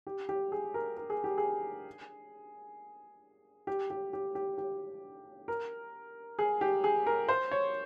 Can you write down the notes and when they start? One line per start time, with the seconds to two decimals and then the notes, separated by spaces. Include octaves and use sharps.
0.07 G4
0.29 G4
0.52 G#4
0.74 A#4
0.97 A#4
1.10 G#4
1.24 G4
1.38 G#4
3.67 G4
3.90 G4
4.13 G4
4.35 G4
4.58 G4
5.48 A#4
6.39 G#4
6.61 G4
6.84 G#4
7.07 A#4
7.29 C5
7.51 C#5